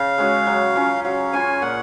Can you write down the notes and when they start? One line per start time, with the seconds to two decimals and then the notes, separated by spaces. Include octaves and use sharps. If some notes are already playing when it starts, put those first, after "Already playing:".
Already playing: C#3 F5
0.18 G#3 C#4 F#4
0.47 F#3
0.76 C#4 F4
1.04 F#3 F5
1.33 C#4 F4 G#5
1.62 A#2 F#5